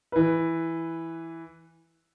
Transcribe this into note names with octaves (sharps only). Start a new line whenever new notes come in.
E3 B4